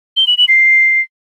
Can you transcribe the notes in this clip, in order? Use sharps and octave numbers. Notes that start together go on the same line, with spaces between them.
G7
F#7
F#7
C7